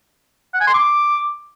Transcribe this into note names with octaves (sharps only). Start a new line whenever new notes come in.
F#5
G#5
C6
D6